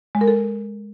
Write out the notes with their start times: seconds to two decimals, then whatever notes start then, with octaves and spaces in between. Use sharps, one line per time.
0.15 G#3
0.21 A#4
0.28 A4